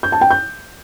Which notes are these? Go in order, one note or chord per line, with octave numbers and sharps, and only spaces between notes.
G6
A5
G5
G6